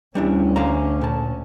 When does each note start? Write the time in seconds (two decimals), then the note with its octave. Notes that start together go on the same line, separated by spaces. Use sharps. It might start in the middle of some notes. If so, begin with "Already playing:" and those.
0.15 D2 G3 C#4 D4 E4
0.56 D3 F5 A#5
1.01 A#2 A5